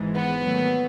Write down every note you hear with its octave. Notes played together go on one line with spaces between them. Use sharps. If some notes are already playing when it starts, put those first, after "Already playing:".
Already playing: G#1 G#2 E3 G#3
B3
D#2 D#3 F#3 A3